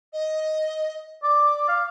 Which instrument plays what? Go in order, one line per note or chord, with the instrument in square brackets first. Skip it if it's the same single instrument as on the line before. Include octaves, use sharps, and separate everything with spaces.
[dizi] D#5
[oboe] D5 [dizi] D6
[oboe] F5